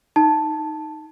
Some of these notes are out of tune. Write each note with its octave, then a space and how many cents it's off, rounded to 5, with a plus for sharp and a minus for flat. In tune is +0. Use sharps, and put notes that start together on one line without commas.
D#4 +0 A5 +0